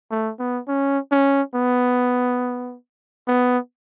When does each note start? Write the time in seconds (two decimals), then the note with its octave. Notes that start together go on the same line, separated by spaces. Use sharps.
0.11 A3
0.39 B3
0.68 C#4
1.12 C#4
1.54 B3
3.28 B3